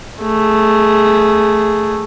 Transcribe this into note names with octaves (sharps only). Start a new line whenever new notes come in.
A3 G#4